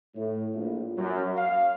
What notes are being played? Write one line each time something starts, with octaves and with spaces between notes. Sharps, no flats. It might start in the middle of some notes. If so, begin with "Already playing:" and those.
A2
A#1
F#2
F5